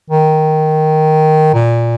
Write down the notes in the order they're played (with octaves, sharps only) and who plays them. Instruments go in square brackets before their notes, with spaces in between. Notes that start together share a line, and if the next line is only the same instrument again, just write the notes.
[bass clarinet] D#3
A#2